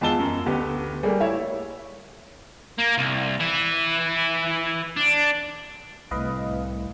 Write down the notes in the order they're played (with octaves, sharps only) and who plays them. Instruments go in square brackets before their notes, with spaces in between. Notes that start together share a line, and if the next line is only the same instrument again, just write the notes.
[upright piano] E2 G#3 F4 A5 E6 G7
F#2
D2 B3 G4
G3 A3 A#3 G#4
E4 C#5 E5
[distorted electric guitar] A#3
C2
E3 E4
D4
[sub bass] C2 [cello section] A2 C3 [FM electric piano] B4 D#5 F5